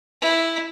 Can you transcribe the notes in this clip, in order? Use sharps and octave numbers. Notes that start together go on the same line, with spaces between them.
E4